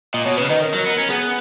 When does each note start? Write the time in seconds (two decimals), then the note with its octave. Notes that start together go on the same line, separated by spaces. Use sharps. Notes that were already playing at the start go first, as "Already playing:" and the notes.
0.14 A#2 D#5
0.26 B2 C#5
0.37 C#3 B4
0.50 D#3 D#5
0.62 A#4
0.74 F#3
0.86 B3
0.98 C#4
1.10 B3 G#4